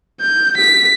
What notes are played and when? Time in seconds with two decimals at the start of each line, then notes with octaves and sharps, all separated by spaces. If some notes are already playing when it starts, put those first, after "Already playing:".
0.21 G6
0.57 B6